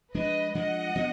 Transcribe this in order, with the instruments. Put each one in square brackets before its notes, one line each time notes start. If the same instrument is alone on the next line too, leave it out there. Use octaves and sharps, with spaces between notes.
[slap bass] F3 G#3 D4 [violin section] B4 D#5
[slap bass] F3 G#3 D4 [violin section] D#5 F#5
[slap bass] F3 B3 D4